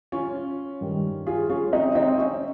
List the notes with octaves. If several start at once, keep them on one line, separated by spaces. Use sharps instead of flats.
C#4 F4
G2 D#3 G3
F4 G#4
C#4 F4
C4 D#4
C4 D#4
C#4